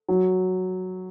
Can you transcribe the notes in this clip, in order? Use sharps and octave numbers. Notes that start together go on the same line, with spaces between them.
F#3